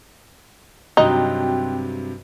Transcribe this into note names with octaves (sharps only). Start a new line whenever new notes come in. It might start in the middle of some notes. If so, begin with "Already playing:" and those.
G2 C3 F#3 C4 D#4 F#4 G5